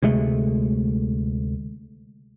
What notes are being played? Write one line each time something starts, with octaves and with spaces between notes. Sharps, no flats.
D2 C3 G#3 A3